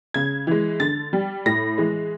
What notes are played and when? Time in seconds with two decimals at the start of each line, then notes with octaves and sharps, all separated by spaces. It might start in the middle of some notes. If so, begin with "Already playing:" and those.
0.14 C#3 G#6
0.47 E3 G#3
0.80 D3 A6
1.13 G3
1.46 A2 A#6
1.78 E3 G#3